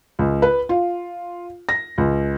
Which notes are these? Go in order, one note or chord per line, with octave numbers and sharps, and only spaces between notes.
C#2
B4
F4
A#6
C#2